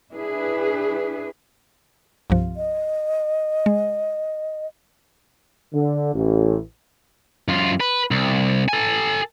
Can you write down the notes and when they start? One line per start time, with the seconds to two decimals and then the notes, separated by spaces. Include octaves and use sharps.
0.12 D4 E4 G#4 B4
2.30 C2 G2 F3
2.57 D#5
3.66 G#3
5.73 D3
6.14 A1
7.48 F#2 F4
7.80 B4
8.11 C2
8.68 A4 G#5